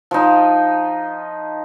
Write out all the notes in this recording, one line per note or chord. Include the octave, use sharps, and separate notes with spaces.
F3 D#4